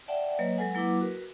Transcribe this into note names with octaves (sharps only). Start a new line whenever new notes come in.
D5 E5 F#5 G5 A5
F#3 A#3 B4 C#5 D#5
F#3 G#3 A4 B4 F#5 G#5
F#3 A#3 E4 B4 F#5 D6
F#4 A#4 B4